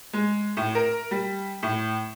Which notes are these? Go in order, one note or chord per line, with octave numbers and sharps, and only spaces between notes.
G#3
A2
A#4
G3
A2